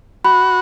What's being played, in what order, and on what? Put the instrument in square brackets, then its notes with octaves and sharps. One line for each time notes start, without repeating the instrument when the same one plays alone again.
[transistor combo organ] F#4 [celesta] B5